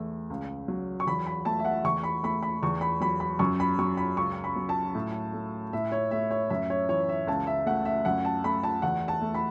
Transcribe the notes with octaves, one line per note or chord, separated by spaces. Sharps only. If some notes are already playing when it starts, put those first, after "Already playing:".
Already playing: E2 A3
C#2
F#3
C#6
E2 B5
B5
A3 A5
E5
F#5
E2 C#6
B5
A3 B5
B5
E2 C#6
B5
F#3 B5
B5
F#2 C#6
B5
F#3 C#6
B5
C#2 C#6
B5
F#3
A5
A2
A3
A2 E5
C#5
A3 E5
C#5
F#2 E5
C#5
E3 C#5
E5
C#2 A5
E5
A3 F#5
E5
F#2 F#5
A5
A3 B5
A5
E2 F#5
A5
A3
B5